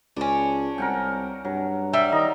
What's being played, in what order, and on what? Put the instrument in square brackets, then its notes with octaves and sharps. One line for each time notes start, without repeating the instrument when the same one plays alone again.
[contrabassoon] C#2 [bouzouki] C#4 D4
[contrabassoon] C2 [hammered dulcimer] A#4 F#5 G5
[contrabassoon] G2 [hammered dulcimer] F#3
[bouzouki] G3 [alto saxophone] E5
[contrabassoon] D#3 [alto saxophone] D#5 [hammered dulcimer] A#5